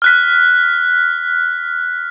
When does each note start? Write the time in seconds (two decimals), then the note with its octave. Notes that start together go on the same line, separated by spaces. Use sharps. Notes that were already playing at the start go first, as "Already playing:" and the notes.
0.02 F6 F#6 B6